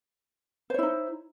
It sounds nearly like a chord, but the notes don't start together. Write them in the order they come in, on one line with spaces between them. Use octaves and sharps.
C5 C#5 E4 D#4